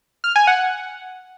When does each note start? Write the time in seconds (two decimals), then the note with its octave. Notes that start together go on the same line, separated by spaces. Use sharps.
0.24 F6
0.36 G#5
0.47 F#5